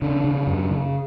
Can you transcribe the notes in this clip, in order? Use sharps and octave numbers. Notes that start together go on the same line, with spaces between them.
C#3 D4
C#3
F#2
C#3